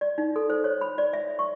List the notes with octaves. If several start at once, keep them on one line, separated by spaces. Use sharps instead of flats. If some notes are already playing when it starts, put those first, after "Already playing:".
D5
D#4
A4
C5
C#5
B5
D5
E5
C#6